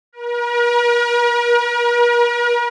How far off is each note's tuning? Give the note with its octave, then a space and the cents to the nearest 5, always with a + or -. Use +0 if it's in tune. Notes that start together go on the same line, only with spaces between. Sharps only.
A#4 +45